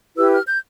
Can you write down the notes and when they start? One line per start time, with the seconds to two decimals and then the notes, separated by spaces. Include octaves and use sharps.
0.15 E4 G4 B4 E6
0.31 F6
0.47 G6